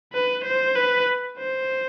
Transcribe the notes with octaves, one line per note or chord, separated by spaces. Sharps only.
B4
C5
B4
C5